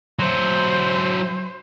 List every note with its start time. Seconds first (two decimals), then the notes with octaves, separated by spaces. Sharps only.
0.19 F#3 E4 C5